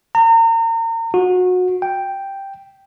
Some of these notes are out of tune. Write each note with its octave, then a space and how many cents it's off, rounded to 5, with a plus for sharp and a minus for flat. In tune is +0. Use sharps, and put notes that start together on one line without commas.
A#5 -35
F#4 -25
G5 +0